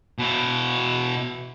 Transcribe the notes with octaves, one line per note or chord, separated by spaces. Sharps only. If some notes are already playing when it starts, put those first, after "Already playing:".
B2 E4